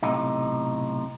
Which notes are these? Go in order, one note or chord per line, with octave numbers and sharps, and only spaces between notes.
B1 A2 C3 D#4